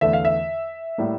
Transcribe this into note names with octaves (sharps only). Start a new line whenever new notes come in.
E2 D3 A3 E5
F5
E5
A2 G3 A#3